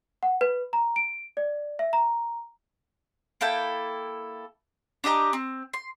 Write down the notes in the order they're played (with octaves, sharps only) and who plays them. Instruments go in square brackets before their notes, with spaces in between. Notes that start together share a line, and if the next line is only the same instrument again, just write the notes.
[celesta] F#5
B4
A#5
D7
D5
E5
A#5
[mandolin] A#3 E4 A4 G5
D4 G4 D#5 A#5
C4
C6